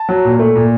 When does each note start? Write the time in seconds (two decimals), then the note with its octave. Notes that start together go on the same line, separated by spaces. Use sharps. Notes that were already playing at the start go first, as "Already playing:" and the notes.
Already playing: A5
0.09 F#3
0.25 A#2
0.39 A3
0.55 A#2